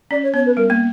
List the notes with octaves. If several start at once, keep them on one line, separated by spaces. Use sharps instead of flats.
C#4 D5
C#5
B3 C#5
B4
G3 A#4
A#3